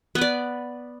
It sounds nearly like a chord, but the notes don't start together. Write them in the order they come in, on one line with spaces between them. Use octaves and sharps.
B3 B4 D5